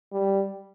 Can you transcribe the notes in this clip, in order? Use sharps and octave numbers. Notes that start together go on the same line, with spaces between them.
G3